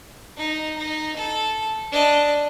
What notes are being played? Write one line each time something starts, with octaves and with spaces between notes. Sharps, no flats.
D#4
D#4
A4
D4 D#5